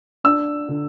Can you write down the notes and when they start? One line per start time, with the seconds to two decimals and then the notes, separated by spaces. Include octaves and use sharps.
0.24 D4 E6
0.68 D3